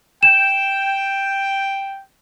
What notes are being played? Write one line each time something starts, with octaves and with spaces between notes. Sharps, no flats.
G5 E7